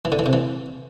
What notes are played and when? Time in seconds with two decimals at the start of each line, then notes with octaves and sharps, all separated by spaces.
0.05 E3
0.12 D3
0.19 E3
0.26 C3
0.33 E3